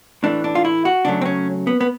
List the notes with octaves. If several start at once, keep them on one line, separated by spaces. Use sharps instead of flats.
A2 E3 A3 D4
D4
F4
E4
F#4
C#3 F#3 A3 D4
C4
C#4
B3
B3